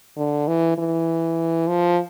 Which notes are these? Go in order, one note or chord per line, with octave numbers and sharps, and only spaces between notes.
D3
E3
E3
F3